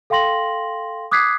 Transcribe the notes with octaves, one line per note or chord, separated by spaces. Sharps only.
A4 F5 G5 C6 A#6 F#7
D6 D#6 F#6 G#6 B6 C7